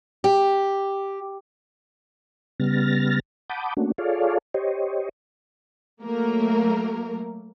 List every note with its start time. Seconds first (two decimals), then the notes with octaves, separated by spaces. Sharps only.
0.24 G4
2.60 C#3 G3 B3 F6 A6 A#6
3.50 F#5 A5 B5 D6 D#6 G6
3.77 A3 A#3 C#4 D4 F#4
3.98 F4 G#4 A4 C#5 D5 F5
4.54 G4 C5 C#5 D#5
6.03 F#3 A3 A#3 A#4